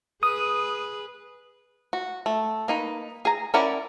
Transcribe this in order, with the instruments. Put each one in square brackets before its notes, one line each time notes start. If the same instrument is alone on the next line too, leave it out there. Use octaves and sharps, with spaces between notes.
[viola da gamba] G#4 B4 [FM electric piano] D#6
[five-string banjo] F#4
A3
A#3 D#4 B4
G#4 A#5
C#4 E4 A#4 D5 F#5